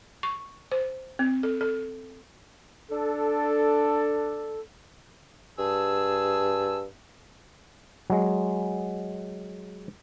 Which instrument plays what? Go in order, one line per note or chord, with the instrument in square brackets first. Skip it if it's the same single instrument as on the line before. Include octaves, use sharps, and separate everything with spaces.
[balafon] C#6
C5
C4
A4
A4
[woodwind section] D4 A4
[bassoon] G2 [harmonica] G#4 A5 E6
[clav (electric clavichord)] F#3 G#3